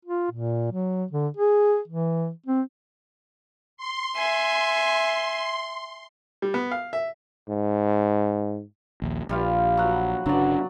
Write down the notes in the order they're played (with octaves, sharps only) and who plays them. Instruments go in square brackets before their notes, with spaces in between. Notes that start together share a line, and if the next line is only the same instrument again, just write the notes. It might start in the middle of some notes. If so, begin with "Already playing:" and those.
[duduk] F4
A#2
F#3
D3
G#4
E3
C4
[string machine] C6
[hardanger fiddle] E5 G#5
[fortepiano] G3
B3
F5
E5
[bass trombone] G#2
[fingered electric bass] A#1 D#2
[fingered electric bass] A#1 [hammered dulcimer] G3 F4 F5
[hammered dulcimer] F#3 F#5
[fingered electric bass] G1 C#3 D4 [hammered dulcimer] F#3 D5